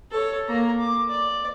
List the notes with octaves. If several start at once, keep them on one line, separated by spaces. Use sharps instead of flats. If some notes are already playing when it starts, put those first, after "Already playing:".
A4 C#5
A#3 A#5
D6
D5